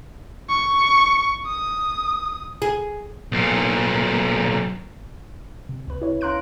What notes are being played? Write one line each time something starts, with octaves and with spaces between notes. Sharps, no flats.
C#6
D#6
G#4
B1 A#2
C3
C#2 B4
E4 C#5
C#4 F5 A#5 C6 F#6 D7